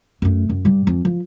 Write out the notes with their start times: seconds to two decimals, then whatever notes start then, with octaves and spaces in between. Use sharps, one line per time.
0.22 F#2 A3
0.50 F#2
0.65 G2 G3
0.87 F2
1.05 F3